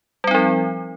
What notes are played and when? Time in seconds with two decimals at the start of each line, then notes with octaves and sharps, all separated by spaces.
0.24 G3
0.27 C4
0.31 D#4
0.34 F3